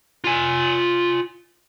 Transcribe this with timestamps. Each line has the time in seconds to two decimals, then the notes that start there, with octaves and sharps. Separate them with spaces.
0.24 F4 G#5